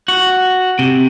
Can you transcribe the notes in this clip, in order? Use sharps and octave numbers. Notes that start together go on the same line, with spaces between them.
F#4
C3